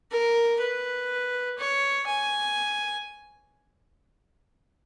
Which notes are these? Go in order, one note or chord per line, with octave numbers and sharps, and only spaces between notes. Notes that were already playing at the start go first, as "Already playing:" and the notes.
A#4
B4
C#5
G#5